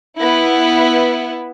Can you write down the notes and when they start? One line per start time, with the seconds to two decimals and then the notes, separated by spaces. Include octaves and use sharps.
0.18 B3 E4